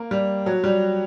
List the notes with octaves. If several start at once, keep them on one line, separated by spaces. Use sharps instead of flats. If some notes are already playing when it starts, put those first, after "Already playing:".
Already playing: A#3
G3
F#3
G3